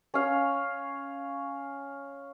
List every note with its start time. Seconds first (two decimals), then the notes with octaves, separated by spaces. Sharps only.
0.14 C#4 F5